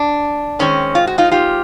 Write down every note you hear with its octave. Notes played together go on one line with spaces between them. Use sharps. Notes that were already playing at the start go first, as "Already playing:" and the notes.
Already playing: D4
D#3 G#3 C4 C#4
F4
F#4
D#4 F4
F4 G4